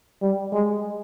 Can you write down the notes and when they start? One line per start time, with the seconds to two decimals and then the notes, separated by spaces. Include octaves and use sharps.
0.22 G3
0.53 G#3